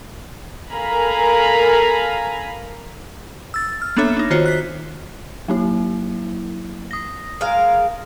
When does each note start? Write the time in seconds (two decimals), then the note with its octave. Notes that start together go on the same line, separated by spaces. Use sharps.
0.71 A4 A#4 F5 G#5 A#5 B5
3.54 E6 A6
3.82 F6
3.96 A#3 B3 D4 A4 C#5 E5
4.17 D4 D#4
4.30 D#3 F4 F#4 C5 C#5 D#5
4.46 F#6 B6
5.48 F#3 A#3 E4
6.91 D#6 A#6
7.41 G#3 A#4 F5